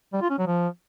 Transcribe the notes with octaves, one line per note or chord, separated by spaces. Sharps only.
G3
F4
C#4
F#3
F3